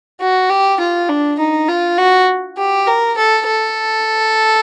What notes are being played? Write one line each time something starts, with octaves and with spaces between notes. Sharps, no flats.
F#4
G4
F4
D4
D#4
F4
F#4
G4
A#4
A4
A4